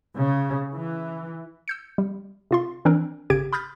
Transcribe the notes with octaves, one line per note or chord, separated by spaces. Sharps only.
C#3
E3
E6 G6 C#7
G3
C3 F4 C6
E3 C4 D4 A#4
G#1 C#3 G4 G#6 D7
B5 D#6 F6 G6 A6 B6